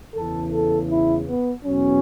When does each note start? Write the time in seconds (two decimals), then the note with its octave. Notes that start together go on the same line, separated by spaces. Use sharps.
0.14 E2 C#3 E3 A4
0.52 A4
0.89 E4
1.27 B3
1.65 E2 B2 F#3 C#4